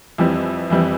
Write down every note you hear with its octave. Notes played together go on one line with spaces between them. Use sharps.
F2 E3 G3 C4 E4
F2 E3 G3 C4 E4